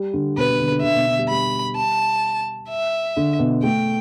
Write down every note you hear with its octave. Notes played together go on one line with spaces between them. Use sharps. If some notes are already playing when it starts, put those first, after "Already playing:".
Already playing: G3
D3
B2 B4
D3
D3
D3
D3 E5
B2
D3
G3
G3 B5
A5
E5
D3
B2
A3 G5